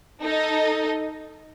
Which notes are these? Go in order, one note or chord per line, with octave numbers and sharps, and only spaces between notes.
D#4 A4 D#5